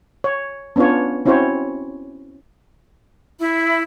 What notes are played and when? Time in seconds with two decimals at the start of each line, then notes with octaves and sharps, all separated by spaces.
0.24 C#5
0.76 B3 C#4 D4 F4 C#5
1.26 C4 C#4 E4 F#4 C5 C#5
3.39 E4